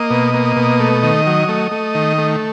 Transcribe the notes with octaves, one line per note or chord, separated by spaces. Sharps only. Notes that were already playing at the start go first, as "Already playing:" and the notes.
Already playing: A#3 D#5
B2
A#3
B2
A3
D#3
F#3
A3
A3
D#3
A3